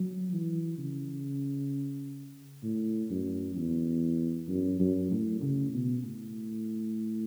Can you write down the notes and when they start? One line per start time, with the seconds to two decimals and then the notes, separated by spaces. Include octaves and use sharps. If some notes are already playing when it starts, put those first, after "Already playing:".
Already playing: F#3
0.33 E3
0.78 C#3
2.63 A2
3.11 F#2
3.56 E2
4.48 F#2
4.80 F#2
5.11 A2
5.42 C#3
5.73 B2
6.03 A2